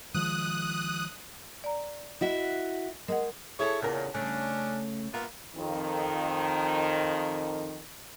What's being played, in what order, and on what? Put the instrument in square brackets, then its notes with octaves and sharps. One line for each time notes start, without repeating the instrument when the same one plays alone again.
[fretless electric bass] D#3 F3 G#3 [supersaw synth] D#6 F#6
[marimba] D5 A#5
[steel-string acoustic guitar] E4 F#4 E5 [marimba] D#5
[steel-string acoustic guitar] G#3 [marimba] A#4 D#5 F#5
[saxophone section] E4 C#5 [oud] G#4 A4
[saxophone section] E2 A#2 [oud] C#3 A#4
[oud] C#3 A3 [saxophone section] C#4 D4
[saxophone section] A#3 B3 F4 [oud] E5
[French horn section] F2 D#3